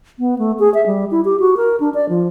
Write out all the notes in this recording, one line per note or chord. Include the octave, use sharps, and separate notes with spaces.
B3
A3
G#4
E5
G3
E4
G4
F#4
A#4
D4
D5
F3